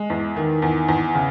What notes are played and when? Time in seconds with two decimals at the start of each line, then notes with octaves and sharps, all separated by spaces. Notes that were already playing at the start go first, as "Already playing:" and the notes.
Already playing: G#3
0.10 E2
0.37 D#3
0.62 E2
0.88 E2
1.15 C#3